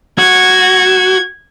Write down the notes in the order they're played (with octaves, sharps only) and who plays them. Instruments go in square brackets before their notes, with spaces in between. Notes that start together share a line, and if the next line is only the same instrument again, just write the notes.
[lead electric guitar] F#4 [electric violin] G#6